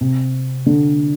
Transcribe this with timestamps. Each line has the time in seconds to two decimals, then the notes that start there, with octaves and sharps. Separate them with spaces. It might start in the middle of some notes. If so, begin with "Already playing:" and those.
0.01 C3
0.66 D3